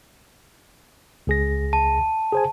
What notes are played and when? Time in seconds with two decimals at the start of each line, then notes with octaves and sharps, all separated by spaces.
1.27 C#2 G#4 A#6
1.73 A5
2.32 G#4 C5 G#5